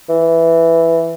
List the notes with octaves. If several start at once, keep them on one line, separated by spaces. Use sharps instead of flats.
E3